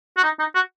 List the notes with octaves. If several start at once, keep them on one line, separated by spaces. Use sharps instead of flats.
F#4
D#4
D#4
F#4